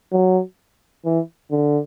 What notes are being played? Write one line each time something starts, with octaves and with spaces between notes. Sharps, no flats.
F#3
E3
D3